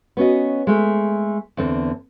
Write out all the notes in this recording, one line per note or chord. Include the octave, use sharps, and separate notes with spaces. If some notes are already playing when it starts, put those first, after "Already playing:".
B3 C#4 F#4 D#5
G#3 A3
E2 D3 C4